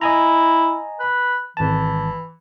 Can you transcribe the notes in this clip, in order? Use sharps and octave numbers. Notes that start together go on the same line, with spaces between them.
E4 D#5 G#5 A#5
B4
G#1 E3 A5